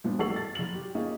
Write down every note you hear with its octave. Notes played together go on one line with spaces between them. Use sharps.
G2 A#2 F3 B3 D4
A1 G3 A4 C#6 C7 F#7
A6
F#1 F#7
G4
A#3 C#4 D#4 F4 G#4